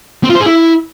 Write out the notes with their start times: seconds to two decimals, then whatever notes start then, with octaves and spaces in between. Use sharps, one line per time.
0.24 C4
0.29 F4
0.35 C5
0.40 G#4
0.46 E4